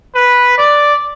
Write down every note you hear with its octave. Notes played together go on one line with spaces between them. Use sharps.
B4
D5